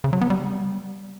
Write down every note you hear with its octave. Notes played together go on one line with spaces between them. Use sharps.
C#3
F#3
B3
G3